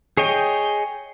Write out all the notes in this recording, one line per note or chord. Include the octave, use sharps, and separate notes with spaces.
G#4 C#5 D#5 G5